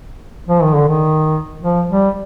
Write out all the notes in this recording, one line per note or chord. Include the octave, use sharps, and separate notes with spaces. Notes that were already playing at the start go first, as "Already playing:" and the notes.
F3
D#3
D3
D#3
F3
G3